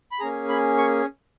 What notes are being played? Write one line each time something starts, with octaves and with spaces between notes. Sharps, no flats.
B5
A#3 C#4 G#4 A#5
B5
C#6